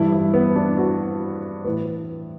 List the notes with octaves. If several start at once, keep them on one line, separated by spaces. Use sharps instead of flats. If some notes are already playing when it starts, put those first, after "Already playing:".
Already playing: G2 E3 E4
E4
B3
D4
F#4
A2 E3 B4